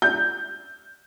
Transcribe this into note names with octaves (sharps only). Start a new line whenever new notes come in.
G6